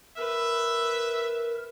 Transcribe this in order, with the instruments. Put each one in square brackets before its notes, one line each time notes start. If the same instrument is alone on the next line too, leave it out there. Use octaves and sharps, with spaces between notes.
[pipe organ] A#4 [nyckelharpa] B4 [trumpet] E5